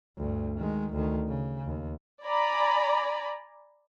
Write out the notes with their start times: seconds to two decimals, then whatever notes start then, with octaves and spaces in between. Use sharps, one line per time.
0.18 D2 G2
0.58 D#3 G#3
0.93 D2 D#3
1.28 C#3
1.66 D#2
2.24 D5 G#5 A#5 B5